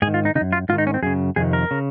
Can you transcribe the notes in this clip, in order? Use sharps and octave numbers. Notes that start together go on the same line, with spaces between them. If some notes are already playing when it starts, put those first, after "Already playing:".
G#2 G#4
D#3
F4
D#4
C#3 D#4
F#2
F4
G#2 D#3 F4
D#4
C#4
C4
F#2 C#3 G#4
F2 C3 D#3 G#4
A#4
C#3